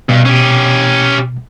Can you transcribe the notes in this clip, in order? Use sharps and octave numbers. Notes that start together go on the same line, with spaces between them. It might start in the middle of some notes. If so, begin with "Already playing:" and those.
G2 B2
C#4 G4